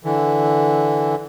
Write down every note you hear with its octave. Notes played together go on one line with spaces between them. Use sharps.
D3 E3